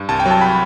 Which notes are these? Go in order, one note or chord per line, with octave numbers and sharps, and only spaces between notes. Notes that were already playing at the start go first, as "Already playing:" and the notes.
Already playing: G2
C2 A5
G5
F#3
A5
B5